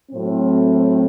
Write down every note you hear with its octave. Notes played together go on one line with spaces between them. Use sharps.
A2 F#3 C4